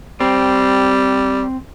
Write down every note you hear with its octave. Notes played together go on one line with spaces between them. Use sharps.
G3 C4